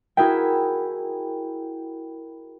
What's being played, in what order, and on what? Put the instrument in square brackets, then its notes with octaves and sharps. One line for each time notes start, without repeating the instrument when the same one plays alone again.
[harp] E4 F#4 G#4 A#4 E5 G5